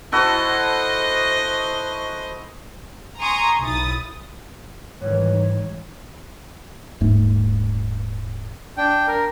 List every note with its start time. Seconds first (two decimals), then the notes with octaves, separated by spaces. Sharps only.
0.12 E4 F#4 A4 C5 D#5
3.18 G#5 A#5 C6 C#6 D#6
3.61 B1 E4 D#6 A6
5.01 G#2 D#3 E3 G3 C#5
7.01 D#1 G#2 A3
8.78 D4 G5
9.07 A#4